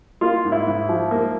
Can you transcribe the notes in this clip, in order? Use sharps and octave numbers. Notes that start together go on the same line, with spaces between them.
A#3 F4
G#2
E4
G#2
F3
A#3